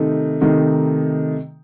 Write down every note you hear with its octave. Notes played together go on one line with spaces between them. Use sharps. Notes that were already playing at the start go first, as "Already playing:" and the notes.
Already playing: C3 D#3 A3 D#4
C3 D#3 A3 D#4